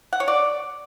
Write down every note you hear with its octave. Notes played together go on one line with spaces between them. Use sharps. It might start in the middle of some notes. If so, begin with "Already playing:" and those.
F#5
C#5
D5